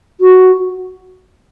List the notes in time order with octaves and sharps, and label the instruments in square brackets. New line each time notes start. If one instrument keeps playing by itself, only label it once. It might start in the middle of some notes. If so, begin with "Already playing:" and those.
[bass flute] F#4